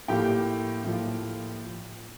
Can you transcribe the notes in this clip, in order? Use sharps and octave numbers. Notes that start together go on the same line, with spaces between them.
A2 F3 A#3 G4 G5
A2 F3 A#3